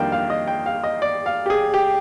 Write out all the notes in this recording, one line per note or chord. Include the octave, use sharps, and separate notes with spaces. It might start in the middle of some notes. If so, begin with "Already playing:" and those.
Already playing: F2 D#3 G3 A#3 D4 F5 G5
F5
D#5
G5
F5
D#5
D5
F5
G4
G#4
G4